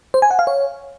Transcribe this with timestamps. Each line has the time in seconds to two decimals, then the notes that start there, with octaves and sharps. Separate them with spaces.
0.14 C5
0.22 G#5
0.31 F#5
0.39 F5
0.47 C#5